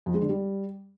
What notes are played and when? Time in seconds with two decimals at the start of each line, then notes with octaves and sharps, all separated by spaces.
0.06 F2
0.14 G#3
0.22 D3
0.29 G3